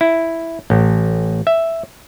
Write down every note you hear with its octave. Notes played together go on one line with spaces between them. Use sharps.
E4
A1
E5